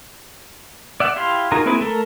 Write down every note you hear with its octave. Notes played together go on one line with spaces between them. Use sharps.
D5 E5 F#5
E4 G4 F5 C6
D#4 F4 F#4 G#4 A#4
A#3 C4 E4 G#4 B4
A3 A4 A#4